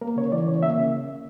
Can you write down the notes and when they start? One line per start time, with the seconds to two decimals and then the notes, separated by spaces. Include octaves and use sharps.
0.02 A#3 A#4
0.17 C#3 C#5
0.32 E3 D5
0.48 C#3 C#5
0.63 A#3 E5
0.77 C#3